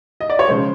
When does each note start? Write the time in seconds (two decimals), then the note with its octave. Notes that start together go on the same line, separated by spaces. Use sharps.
0.20 D#5
0.30 D5
0.39 C#5
0.48 C#3 F3 G#3 C5